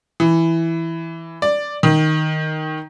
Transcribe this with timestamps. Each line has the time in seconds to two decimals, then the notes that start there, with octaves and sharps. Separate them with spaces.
0.20 E3
1.42 D5
1.83 D#3